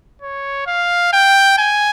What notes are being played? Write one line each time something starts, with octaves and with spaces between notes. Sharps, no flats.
C#5
F5
G5
G#5